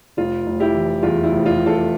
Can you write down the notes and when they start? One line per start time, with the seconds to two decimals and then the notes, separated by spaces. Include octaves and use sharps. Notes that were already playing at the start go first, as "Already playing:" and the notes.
0.17 F1 F4
0.46 F1
0.60 E4 G4
0.74 E3
1.03 E2 F4
1.24 E4
1.32 F1
1.46 F4
1.60 F1
1.66 F4 A4